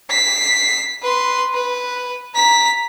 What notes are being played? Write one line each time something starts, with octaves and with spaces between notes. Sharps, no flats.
B6 C7
B4 C6
B4
A#5 B6